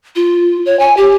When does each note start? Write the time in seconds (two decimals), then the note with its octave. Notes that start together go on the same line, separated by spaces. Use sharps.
0.16 F4
0.66 C#5
0.79 G#5
0.97 G4